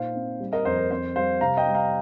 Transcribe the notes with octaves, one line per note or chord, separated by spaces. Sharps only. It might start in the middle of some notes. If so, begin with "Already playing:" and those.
Already playing: A#2 D#4 C5 F5
C4
G3
A#4 D#5
F2 C5
A#4
C4 C5
G3 C5 F5
C3 F5 A#5
D#5 G5
G3
F5 A#5